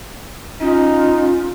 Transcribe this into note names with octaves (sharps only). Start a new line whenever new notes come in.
C#4 D#4 F4